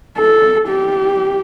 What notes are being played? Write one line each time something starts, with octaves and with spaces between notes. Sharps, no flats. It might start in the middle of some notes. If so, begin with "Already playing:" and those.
A4
G4